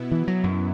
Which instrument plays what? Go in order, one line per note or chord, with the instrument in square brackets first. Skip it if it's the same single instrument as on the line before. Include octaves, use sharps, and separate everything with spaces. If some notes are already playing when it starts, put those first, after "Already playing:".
Already playing: [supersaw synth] B2 B3 E4
[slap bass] E3
F#3
F#2